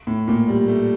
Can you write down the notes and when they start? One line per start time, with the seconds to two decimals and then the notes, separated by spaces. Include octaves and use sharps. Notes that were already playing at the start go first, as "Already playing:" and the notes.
0.07 A2
0.28 A#2
0.48 G3
0.68 A3